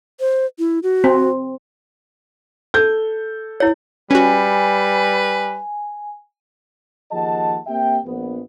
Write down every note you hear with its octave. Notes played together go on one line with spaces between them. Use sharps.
C5
E4
F#4
C4
A4 G6
E4 C#5
G3 C#4 F#4 B4 G#5
D#2 F3 G#4 D#5 F#5 A5
A#3 C4 G4 E5 G5
A#1 B3